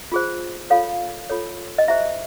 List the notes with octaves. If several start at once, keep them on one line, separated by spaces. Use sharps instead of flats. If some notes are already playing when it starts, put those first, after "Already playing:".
F4 G#4 C5
F4 A4 C#5 F5
F4 A4 C#5
D#5
E4 G4 C5 E5